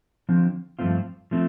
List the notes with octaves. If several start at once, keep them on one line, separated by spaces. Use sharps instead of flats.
D3 F3 C4
G2 F3 A3 C4 F4
F3 A3 C4